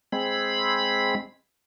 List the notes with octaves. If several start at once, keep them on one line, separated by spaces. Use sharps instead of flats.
G#3 C4 B5